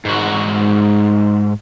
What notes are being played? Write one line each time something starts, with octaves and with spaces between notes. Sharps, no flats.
G#2 F#4